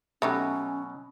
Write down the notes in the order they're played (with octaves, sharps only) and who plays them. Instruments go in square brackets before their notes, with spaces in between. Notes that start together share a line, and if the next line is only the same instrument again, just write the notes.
[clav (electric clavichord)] B2 F#3 [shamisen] A3 D#4 G4 [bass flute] C#4